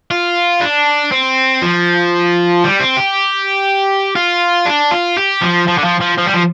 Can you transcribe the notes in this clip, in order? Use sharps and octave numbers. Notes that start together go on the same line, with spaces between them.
F4
D4
C4
F3
G3
C4
G4
F4
D4
F4
G4
F3
F3
D3
F3
F3
F3
G3
F3